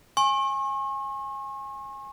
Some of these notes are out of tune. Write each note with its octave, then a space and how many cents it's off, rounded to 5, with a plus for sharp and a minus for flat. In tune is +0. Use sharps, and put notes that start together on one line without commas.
G#5 -10 C#6 -40